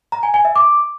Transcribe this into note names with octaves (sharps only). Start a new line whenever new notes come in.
A#5
G#5
G#5
E5
D6